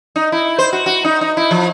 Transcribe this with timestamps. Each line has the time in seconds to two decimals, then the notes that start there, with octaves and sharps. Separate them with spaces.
0.16 D#4
0.32 E4
0.59 C5
0.73 F#4
0.86 F#4
1.05 D#4
1.21 D#4
1.37 E4
1.51 F3